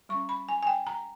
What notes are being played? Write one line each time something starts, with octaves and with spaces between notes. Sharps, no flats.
G3 C#4 C#6
B5
G#5
G#5
G5
A#5